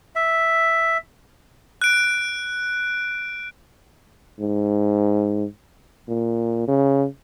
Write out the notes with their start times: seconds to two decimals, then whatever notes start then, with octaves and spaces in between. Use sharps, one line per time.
0.16 E5
1.82 F#6 D7
4.40 G#2
6.08 A#2
6.67 C#3